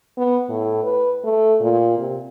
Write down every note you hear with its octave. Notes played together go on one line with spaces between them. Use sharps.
B3
A2
B4
A3
A#2
C3